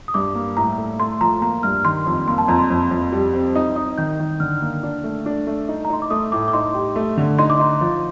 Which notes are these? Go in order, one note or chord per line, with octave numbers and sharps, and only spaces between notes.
D#6
G2 D6
A#3
A2 A#5
A3
A3 C6
F3 A#5
A#3 A#5
G2 F6
D#3 C6
F2
A#3 C6
A5
F2 A#5
C6
F2
F2
G3
C4
D#4 D#6
D#4 D#6
D#3 G6
D#3
D3 F6
A#3
D4
A3
D4
A3
D#4
A#5
D#4 C6
D6
A3 D#6
A2 D6
D6
D#4 C6
G4
A3
D3
D#4 C6
D6
D#4 C6
F3